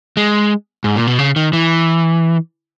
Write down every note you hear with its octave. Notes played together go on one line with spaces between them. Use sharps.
G#3
G#2
A#2
B2
C#3
D#3
E3